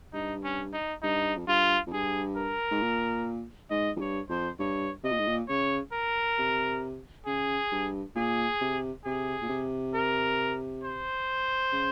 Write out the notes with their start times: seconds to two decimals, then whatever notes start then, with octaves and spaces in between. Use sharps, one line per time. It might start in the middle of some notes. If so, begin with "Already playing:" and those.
0.13 G2 D#4
0.44 C#4
0.73 D#4
1.03 G2 D#4
1.36 F2
1.47 G2 F4
1.87 F2
1.92 G2 G#4
2.37 A#4
2.71 G#2
2.81 A#2
3.70 G#2 D#5
3.96 F2
4.00 G2 C#5
4.29 F2 C5
4.59 G2 C#5
5.03 C3 D#5
5.12 A#2
5.19 G#2
5.27 A#2
5.48 C#3 C#5
5.93 A#4
6.38 C3
7.27 C#3 G#4
7.72 G2
8.15 A#2 G#4
8.61 C3
9.05 C3 G#4
9.42 A#2
9.49 C3
9.94 A#4
10.84 C5
11.72 C#3